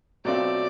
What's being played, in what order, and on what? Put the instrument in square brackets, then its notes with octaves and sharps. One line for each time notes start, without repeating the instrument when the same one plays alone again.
[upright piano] B2 F#3 A3 C4 F4 [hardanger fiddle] D5